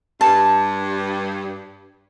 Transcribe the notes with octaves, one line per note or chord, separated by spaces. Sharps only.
G2 A5